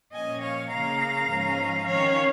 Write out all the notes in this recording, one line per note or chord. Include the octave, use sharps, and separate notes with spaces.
A#2 F3 C#4 D#5 G#5
C#5 F5
C#3 A#3 C#4 F5 A#5
G#2 F3 C#4
D#3 C#4 C#5 F5